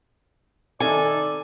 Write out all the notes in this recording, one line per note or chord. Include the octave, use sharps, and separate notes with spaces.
C3 D#3 D#4 A4 D5 G#5